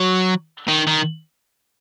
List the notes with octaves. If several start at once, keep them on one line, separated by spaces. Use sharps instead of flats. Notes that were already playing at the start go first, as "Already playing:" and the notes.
Already playing: F#3
D#3
D#3